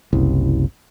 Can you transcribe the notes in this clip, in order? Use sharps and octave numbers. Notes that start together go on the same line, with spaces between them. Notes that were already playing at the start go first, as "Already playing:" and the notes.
F#1 C2